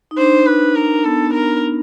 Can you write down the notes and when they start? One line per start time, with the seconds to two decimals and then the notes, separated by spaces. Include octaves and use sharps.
0.11 D#4
0.18 D4 C5
0.46 B4
0.76 A#4
1.05 B3 A4
1.34 A#4